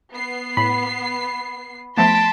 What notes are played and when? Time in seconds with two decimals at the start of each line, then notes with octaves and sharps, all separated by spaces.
0.13 B3 C7
0.57 A2 B5
1.97 F3 A3 B3 A5 C6 B6 D7